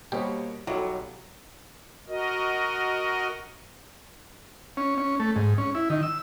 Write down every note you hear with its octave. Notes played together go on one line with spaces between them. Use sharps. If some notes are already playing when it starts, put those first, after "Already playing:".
B2 G3 A#3 G4 C5 C#5
B1 F#3 G3 A4 C#5
F#4 A#4 D#5
C#4
C#4
A3
G#2
C#4
E4
D#3
E6